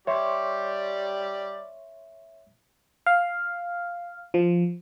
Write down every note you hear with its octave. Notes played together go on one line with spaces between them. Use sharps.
G3 G4 C#5 D5 E5 C6 C#6
F5
F3